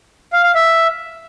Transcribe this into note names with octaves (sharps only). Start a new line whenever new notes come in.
F5
F5
E5